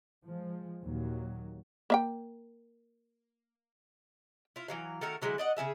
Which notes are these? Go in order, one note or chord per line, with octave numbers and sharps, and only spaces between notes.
F3 G#3
D#2 A#2 F#3
A#3 E5 G5
E4 F4
E3 F#3 F5
D#3 A3 F#4 A#4
D3 F#3 G#3 E4
D5 D#5 F#5
C#3 A#3 G#4 E5